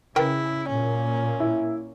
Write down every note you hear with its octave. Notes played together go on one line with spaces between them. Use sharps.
C#3 E4 A#4 B4 G5
A#2 A#3 C#4
E4